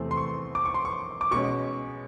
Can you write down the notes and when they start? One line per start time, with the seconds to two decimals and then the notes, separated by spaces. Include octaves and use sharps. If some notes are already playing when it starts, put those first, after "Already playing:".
Already playing: E2 C3 E3 A3 C4
0.11 C6
0.17 C#6
0.55 D6
0.65 C#6
0.74 C6
0.85 C#6
1.21 D6
1.31 B2 G#3 C#4 C#6